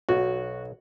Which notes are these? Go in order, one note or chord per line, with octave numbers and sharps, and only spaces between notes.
B1 F#4